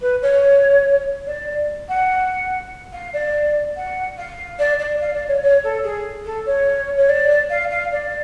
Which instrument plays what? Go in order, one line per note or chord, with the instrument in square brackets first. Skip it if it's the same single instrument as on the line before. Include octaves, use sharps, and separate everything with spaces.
[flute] B4
C#5
D5
F#5
F5
D5
F#5
F5
D5
D5
F5
D5
C#5
C#5
A4
G#4
A4
C#5
C#5
D5
F5
F5
D5